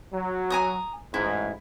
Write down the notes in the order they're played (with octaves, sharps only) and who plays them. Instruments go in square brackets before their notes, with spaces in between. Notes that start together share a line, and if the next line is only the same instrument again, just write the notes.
[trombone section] F#3
[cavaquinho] G#5 A#5 D#6
[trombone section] A1 G#2 [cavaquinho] E4